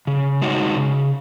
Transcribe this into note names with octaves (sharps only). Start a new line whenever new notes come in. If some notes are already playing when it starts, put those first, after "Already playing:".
C#3
G#3 D#4 F#4 C#5
C#3